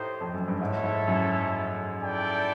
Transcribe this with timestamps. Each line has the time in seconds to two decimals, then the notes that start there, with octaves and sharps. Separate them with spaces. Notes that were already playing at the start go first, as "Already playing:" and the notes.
Already playing: A2 D#4 G4 C5
0.21 F2
0.34 F#2
0.48 G2
0.60 G#2 E4 A4 C#5 E5
0.84 G#2
1.08 F#2
2.00 E4 A4 D5 G5